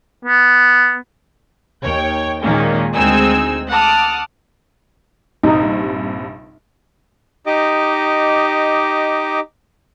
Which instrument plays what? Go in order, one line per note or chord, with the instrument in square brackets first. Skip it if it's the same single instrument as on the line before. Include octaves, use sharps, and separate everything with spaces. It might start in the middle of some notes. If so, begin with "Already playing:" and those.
[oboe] B3
[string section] D#2 C#5 G5
A#2 D#3 G#3 A#3 C#4
D2 G#3 C4 D#4 G#5 E6
F#5 A5 D6 D#6 F6
[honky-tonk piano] A#1 G2 C3 [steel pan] D#4
[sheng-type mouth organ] D#4 G4 D#5 D6